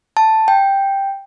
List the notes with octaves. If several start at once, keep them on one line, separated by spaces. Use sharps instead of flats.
A5
G5